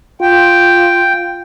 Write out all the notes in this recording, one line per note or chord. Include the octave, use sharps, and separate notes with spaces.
F4 G5